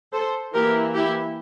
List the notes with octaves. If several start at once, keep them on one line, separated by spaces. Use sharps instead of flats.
A4 C5
E3 A#3 E4 G4 A#4
E4 G4